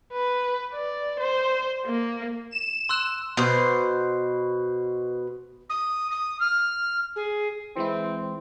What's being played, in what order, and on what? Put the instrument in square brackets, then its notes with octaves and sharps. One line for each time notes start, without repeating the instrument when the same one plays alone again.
[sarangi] B4
D5
C5
A#3
[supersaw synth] E7
[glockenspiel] C6 E6 F#6
[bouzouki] B2 C5
[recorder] D#6
D#6
F6
G#4
[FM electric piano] E3 G#3 E4 [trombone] C4